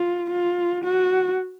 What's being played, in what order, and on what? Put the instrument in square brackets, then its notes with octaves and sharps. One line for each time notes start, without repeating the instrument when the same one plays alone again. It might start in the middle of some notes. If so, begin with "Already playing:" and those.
Already playing: [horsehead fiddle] F4
F4
F#4